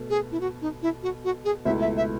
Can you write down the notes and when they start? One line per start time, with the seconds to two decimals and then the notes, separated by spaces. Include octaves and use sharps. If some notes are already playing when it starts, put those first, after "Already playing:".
Already playing: B2 A3
0.10 G#4
0.32 E4
0.41 F#4
0.62 D#4
0.82 E4
1.03 F#4
1.24 F#4
1.45 G#4
1.65 C#2 B2 A3 E4 E5
1.81 E5
1.97 E5